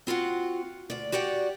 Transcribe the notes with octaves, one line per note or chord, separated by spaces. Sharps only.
C4 F4 F#4 F#5
D2 D5
F#4 G4 D5 F#5 G5